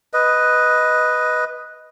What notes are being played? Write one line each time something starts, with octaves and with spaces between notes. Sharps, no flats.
B4 D#5